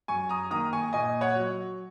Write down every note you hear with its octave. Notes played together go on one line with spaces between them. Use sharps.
F#2 G#5 C#6
A#5 D#6
D#3 A#3 A#5 D#6
G#5 C#6
A#2 D#5 G#5
C#5 F#5
F#3